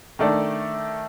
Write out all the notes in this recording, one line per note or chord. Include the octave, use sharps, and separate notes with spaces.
D#3 A3 D4 A4 D5